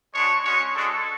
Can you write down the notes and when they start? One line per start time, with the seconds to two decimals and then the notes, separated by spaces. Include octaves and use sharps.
0.14 G#3 D4 F#4 C#5
0.44 G#3 C#4 F#4 C#5
0.75 G#3 D4 F#4 A4